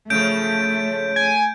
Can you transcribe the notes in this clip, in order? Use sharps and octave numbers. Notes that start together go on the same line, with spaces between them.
C#3 F3 A3 G6 D7
G#5